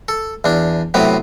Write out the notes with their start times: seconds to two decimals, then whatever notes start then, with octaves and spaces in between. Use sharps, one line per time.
0.08 A4
0.44 E2 D4
0.94 A2 C3 F#3 B3